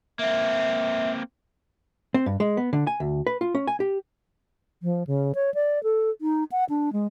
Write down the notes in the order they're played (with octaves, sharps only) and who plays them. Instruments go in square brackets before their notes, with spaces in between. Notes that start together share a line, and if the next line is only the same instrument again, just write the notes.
[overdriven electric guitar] A#3 C4 [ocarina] E5
[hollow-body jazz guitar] C4
G2
G#3
B3
D3
G#5
D2
B4
F4
C#4
G#5
G4
[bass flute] F3
C#3
C#5
D5
A4
D#4
F#5
D4
G#3